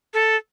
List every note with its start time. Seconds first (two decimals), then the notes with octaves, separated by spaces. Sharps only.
0.14 A4